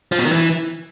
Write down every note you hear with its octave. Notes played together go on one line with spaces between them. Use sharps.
F3
B2
D#3
E3